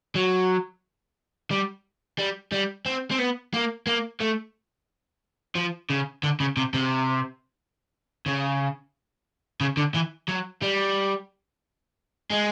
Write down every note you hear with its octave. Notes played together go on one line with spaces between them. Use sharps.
F#3
G3
G3
G3
C4
C4
B3
A#3
A#3
A3
F3
C#3
D3
C#3
C3
C3
C#3
C#3
D3
E3
F#3
G3
G#3